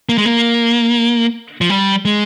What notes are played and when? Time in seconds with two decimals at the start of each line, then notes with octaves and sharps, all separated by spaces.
0.09 A#3
0.18 G#3
0.26 A#3
1.61 F3
1.70 G3
2.05 G#3